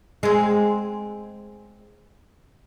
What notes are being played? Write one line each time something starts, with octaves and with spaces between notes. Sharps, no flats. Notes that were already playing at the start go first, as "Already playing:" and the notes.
G#3 C4